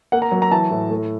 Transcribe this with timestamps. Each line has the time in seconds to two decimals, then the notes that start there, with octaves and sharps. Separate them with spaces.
0.12 A#3 F#5
0.22 A#5
0.32 F#3
0.42 A#5
0.52 E3 A5
0.71 A2
0.90 A3